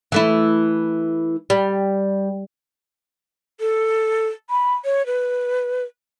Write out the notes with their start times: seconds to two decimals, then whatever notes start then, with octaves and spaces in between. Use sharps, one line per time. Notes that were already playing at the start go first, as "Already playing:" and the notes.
0.12 E3 A3 E4
1.50 G3
3.60 A4
4.50 B5
4.85 C#5
5.06 B4